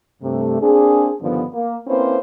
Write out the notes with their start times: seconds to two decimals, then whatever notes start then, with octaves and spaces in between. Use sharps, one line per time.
0.23 G2 C3 A3
0.61 A#3 C4 D4 G#4
1.22 G2 D3 D#3 F3 B3
1.53 A#3
1.87 A#3 C4 C#4 E4 B4 C5